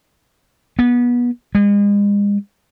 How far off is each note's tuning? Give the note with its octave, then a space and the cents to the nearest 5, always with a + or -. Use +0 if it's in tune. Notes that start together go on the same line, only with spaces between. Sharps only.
B3 -25
G#3 -40